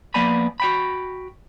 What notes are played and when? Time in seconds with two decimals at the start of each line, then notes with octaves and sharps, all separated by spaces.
0.14 F3 A#3 B3 D5 G#5 B5
0.60 F#4 G5 B5